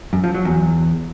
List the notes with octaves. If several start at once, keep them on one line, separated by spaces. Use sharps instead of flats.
F#2
F3
F#3
E2